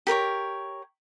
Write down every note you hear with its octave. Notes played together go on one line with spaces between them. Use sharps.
G4 A#4 B4 C#5